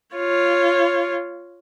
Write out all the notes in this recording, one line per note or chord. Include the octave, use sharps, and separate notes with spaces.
F4 C#5